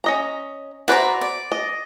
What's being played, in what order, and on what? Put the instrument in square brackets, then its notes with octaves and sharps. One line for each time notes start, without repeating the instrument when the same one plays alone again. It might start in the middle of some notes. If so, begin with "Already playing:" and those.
[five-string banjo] C#4 D#5 A#5
[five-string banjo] F#4 B4 C5 [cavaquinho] D5 E5 A#5
[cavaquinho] D5
[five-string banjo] D#5